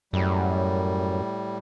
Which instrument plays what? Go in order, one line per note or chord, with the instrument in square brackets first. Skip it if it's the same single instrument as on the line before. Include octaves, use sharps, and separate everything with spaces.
[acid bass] F#2 [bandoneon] A2 G3